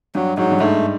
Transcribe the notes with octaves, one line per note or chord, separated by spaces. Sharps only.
G2 F#3
G#2 F#3
G2
G#2 A3